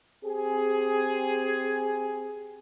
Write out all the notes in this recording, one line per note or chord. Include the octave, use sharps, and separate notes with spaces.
C4 G4 G#4